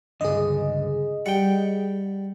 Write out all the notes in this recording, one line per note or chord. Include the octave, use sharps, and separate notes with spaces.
C#2 G2 D3 G#4 D#5
G3 F#5 G5